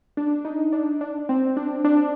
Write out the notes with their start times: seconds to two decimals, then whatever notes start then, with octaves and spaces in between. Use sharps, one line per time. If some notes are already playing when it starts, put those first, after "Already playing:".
0.17 D4
0.45 D#4
0.72 D4
1.01 D4
1.29 C4
1.57 D4
1.84 D4